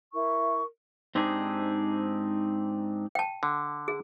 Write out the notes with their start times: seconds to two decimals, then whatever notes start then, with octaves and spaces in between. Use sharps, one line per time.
0.13 E4 A#4 C#6
1.15 G#2 C4 D4 D#4 G4 G#4
3.15 G5 A5
3.43 D3
3.88 G#4